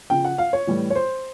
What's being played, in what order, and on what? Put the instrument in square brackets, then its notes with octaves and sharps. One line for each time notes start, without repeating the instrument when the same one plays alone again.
[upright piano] C#3 F3 G5
F#5
F5
C#5
A2 E3 G3
C#5
C5